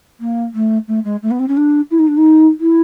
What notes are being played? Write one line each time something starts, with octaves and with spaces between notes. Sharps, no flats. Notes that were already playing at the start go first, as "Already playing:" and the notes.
A#3
A3
A3
G#3
A3
B3
C4
C#4
D4
E4
D#4
D4
D#4
E4